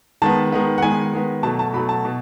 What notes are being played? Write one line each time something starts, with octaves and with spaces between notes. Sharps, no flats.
D#3 G#3 B3 A5
D#3 G#3 B3
F#5
D#3 G#3 B3 G#5
D#3 G#3 B3
B2 F#3 A3 A5
A5
B2 F#3 A3 B5
A5
B2